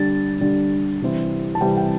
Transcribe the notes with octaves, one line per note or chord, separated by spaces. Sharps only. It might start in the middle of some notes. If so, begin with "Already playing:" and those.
Already playing: D3 G3 D4 A6
D3 G3 D4
C3 E3 G3 C4 E4
A5
C3 E3 G3 C4 E4 G5
G5